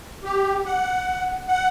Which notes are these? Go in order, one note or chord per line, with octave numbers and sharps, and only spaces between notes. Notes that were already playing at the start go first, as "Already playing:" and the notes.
G4
F#5
F#5